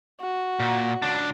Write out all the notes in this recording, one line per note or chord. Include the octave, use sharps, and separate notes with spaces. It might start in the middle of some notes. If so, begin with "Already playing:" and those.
F#4
A#2
C#2 D4